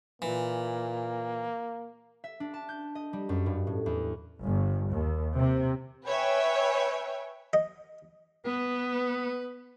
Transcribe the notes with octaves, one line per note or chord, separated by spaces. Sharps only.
A#2 E3 A#3
E5
D4
A5
G6
D#5
G3
F#2
G2
A2
E2
G1
D#2
C3
B4 C#5 E5 G5 G#5
D#5
B3 B4